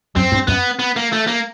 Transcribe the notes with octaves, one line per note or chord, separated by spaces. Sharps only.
F#2 C4
G2
F#2 B3
B3
A#3
A3
A#3